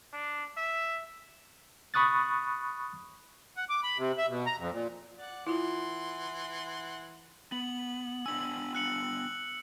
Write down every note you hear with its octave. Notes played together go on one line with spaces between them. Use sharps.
D4
E5
B5 C#6 D#6 F#6 A6
F#5
D6
B5
C3
E5
B2
A#5
F2
A#2
D5 F#5
E3 E4 F4 F#5 C6
B3 F#7
B3 D4 G#5 E6 F#7
F#6 C#7 F#7